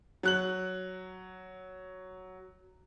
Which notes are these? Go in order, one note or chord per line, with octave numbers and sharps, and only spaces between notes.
F#3 F#6 F#7